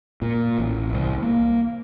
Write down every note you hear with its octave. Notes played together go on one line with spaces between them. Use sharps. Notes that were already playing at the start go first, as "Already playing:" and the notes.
A#2
A1
C2
A#3